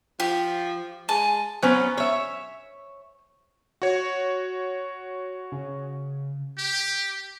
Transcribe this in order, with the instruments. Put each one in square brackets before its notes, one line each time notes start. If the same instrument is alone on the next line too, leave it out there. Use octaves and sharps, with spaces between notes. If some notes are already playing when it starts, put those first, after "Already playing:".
[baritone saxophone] F3 [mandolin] G4
[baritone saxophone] G#3 [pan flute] G#5 [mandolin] A5
[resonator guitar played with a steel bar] F#3 B3 C#4 [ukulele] C5 G#5
[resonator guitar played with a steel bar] C#5 E5
[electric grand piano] F#4 C#5
[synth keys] C#3
[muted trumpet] G4